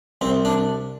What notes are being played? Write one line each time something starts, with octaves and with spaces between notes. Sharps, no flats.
C2 C4
D4